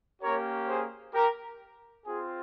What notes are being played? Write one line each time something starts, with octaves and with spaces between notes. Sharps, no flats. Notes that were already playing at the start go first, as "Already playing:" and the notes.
A#3 C#4 G4 A#4 C#5
G#4 C5
G4 A#4
C4 F4 G#4